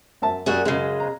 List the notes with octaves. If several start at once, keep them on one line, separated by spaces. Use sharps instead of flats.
F#2 E5 A5
F#2 G3 A#3 F#4 G#4
F#2 C#3 G#3
A#5